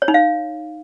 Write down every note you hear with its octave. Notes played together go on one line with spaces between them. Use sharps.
C#5
D#4
F5